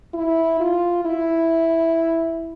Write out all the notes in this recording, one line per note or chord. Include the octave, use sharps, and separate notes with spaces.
E4
F4
E4